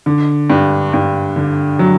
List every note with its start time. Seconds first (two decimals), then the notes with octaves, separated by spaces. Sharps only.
0.06 D3
0.50 G2
0.93 G2
1.36 D3
1.79 F#3